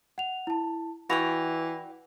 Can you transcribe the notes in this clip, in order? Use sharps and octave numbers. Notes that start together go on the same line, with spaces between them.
F#5 F7
E4 A5
E3 F#4 D5 G5 B5 A#6 F7